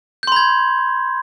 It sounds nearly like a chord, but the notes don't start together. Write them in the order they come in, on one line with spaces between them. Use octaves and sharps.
G6 C6 B5 G#6